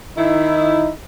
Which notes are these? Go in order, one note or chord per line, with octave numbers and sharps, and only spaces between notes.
D#3 D#4 E4